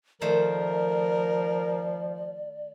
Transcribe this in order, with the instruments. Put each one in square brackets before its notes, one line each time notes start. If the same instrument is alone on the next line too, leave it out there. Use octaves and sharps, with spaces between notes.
[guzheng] D#3 A3 C5 [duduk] F3 [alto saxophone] A#4 [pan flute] D5